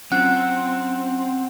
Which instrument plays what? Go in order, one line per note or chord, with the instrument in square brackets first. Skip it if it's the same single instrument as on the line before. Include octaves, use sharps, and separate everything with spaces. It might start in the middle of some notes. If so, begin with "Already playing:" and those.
[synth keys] F#3 C#4 F4 [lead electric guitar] C4 [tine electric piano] F#5 [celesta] F#6